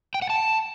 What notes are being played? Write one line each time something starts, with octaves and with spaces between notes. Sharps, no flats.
G5
F#5
A5